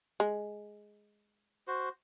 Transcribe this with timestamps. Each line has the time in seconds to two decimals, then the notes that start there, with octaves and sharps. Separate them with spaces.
0.20 G#3
1.68 F#4 C5